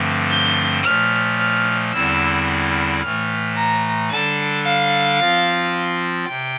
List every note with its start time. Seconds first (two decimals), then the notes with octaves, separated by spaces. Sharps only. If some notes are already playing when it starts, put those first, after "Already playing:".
Already playing: G2 D3 F3 A3 C4
0.30 G6
0.83 A#2 F3 A3 F6
1.38 F6
1.92 E2 D3 G3 C4 E4 E6
2.46 F6
3.01 A2 E3 A3 F6
3.56 A#5
4.10 D3 G3 D4 A4 A5
4.66 F5
5.20 F3 C4 F4
6.28 C3 G5